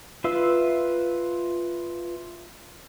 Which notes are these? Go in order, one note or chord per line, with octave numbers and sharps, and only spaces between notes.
F4 B4 E5 F5 E6